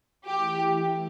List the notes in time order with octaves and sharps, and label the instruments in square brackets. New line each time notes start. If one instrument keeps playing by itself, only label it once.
[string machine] E3 A3 E4 [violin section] G4